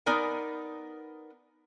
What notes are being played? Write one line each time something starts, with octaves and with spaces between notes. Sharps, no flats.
B3 D#4 A#4 D5 G#5